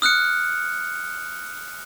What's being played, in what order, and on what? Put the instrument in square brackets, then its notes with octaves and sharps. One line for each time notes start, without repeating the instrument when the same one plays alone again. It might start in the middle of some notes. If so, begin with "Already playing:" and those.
[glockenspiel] D#6 F6 F#6 C#7